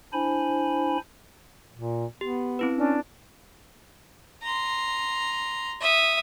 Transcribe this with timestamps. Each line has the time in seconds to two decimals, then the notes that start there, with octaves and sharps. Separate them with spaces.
0.13 D4 E4 C5 G#5 B5
1.76 A#2
2.21 B3 G4
2.59 C4 E4 B4
2.77 C#4 D4
4.43 A#5 C6
5.81 E5 D#6